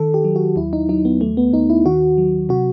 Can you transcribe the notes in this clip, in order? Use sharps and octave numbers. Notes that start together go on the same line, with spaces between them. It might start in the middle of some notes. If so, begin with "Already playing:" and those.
Already playing: D#3 A4
G4
F#3
F#4
D#2 E4
D#4
F#3 D#4
B3
D#2 A3
B3
D#2 D#4
E4
D#3 F#4
F#3
C3 F#4